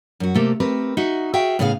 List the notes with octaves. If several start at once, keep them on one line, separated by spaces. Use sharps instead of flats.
F#2 F#4
C3 A3 A#3 G4 A4
A3 C4 G4 A#4 B4
D#4 F#4 D#5 E5
F#4 G#4 E5 F5 G5
A2 C#3 B3 G#4 F5